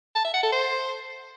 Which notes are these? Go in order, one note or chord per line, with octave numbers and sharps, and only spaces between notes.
A5
E5
F#5
A4
C5